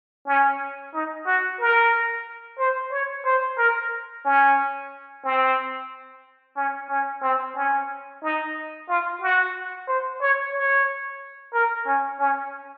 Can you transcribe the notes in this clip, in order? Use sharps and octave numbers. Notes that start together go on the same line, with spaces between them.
C#4
D#4
F#4
A#4
C5
C#5
C5
A#4
C#4
C4
C#4
C#4
C4
C#4
D#4
F4
F#4
C5
C#5
C#5
A#4
C#4
C#4